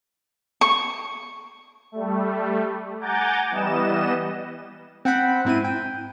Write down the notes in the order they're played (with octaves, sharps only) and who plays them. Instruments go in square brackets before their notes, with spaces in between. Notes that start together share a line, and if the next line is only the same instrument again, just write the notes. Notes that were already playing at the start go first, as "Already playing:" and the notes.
[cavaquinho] C#6
[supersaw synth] G3 A3
F#5 G#5 A#5 D6 G6 A6
E3 G3 B3 D#5 E7
[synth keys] C4 F#5 G5 B5 F#6
G#2 C4 E4 D#7
G5